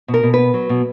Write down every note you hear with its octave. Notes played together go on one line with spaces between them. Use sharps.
B2
A#4
B2
B3 B4
F#3
B2